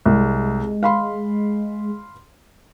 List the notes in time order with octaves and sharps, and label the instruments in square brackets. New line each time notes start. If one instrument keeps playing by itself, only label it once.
[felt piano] C2 [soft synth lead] G#3
[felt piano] F5 B5 C6